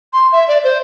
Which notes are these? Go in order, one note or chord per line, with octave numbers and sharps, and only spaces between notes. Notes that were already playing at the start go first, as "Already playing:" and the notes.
C6
E5
D5
C5